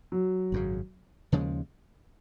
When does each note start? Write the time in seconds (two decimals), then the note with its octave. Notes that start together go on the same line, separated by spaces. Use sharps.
0.12 F#3
0.52 G#1 F#2 C#3
1.32 D#2 C#3 F3 G#3